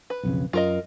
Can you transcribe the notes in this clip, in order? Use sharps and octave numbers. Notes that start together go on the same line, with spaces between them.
B4
B1 F2 C#3
F#2 F4 A#4 D#5